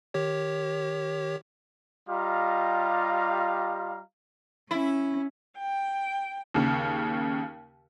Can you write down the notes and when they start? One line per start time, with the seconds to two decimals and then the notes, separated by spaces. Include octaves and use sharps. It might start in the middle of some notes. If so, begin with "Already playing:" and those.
0.14 D#3 G4 C#5
2.09 G3 F4 G4 D#5 F5 A#5
4.71 C#4 E4
5.57 G5
6.54 D#2 C#3